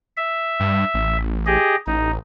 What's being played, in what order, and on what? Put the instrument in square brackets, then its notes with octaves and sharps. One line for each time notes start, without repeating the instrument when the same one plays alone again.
[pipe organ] E5
[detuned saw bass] G2
A1
[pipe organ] G4 G#4 D#5
[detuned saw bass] A1 [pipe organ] D#4